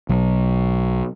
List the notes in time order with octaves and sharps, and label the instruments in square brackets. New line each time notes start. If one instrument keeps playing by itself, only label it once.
[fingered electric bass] B1 F#3